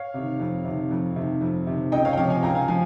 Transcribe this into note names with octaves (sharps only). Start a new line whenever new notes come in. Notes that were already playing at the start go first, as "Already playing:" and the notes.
Already playing: C#5 F5
C3 D#3
F2
C3 D#3
F2
C3 D#3
F2
C3 D#3
C#2 D#5 G5
C#5 F5
G5
C3 F3 C#5 F5
F5 G#5
C#2 G5 A#5
F5 G#5
F3 F5 G#5